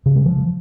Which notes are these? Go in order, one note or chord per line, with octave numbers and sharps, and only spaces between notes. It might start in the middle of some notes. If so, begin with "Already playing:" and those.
C#3
G#3
F3